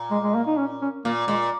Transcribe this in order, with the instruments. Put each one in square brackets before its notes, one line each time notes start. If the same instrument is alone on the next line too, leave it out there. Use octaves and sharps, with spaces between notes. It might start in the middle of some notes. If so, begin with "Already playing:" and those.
Already playing: [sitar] A#2
[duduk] G#3
G#3
A#3
D#4
C#4
C#4
[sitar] A#2 [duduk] A#3
[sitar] A#2 [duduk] G#3